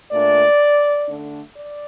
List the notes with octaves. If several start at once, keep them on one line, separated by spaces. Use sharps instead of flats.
A#2 A3 D4 D5
D3 A3 D4
D5